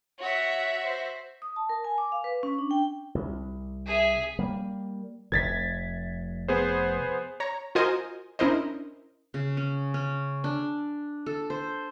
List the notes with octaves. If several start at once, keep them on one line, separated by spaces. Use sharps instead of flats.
F#4 C#5 E5 F#5
C5
D#6
A5
A#4
G#5
D6
F5
B4
C#4
D4
G5
C2
G#4 E5
G3 A#3
F1 C3 G#6 A6 B6
B3 G#4 C5
C#5 A#5
F4 F#4 A#4 C5 D#5 G#5
C#4 D4 E4 A#4 C5 D#5
C#3
C#4
C#4
D4
A4
C5